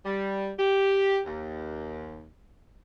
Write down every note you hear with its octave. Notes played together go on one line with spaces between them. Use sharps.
G3
G4
D#2